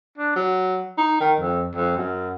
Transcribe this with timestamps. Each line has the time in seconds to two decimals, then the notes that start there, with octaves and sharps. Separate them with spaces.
0.18 D4
0.36 F#3
0.98 D#4
1.20 D#3
1.40 F2
1.76 F2
1.97 F#2